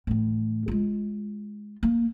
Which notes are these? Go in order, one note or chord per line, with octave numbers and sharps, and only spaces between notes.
A2 E3
G#3 F4
A#3